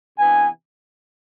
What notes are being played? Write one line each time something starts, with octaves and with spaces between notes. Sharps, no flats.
C3 E3 B3 D4 G#5